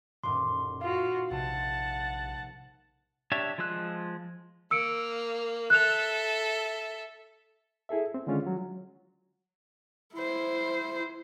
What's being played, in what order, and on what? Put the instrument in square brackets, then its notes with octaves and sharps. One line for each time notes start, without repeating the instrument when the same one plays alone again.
[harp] D#1 A2 D6 [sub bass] F#2 [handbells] C6
[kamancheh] F4 F#4 [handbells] F5
[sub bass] A#1 [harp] C3 [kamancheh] F#5 A5
[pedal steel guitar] D4 G4 C#5 E5
F3 G#3 F4 E6 F#6
[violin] A#3 [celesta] E6 C#7 D7
[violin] A4 E5 [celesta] F#6 F7
[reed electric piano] E4 G#4 A4 E5
C4
D3 D#3 G#3 C#4 F4
F#3
[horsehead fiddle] E4 C5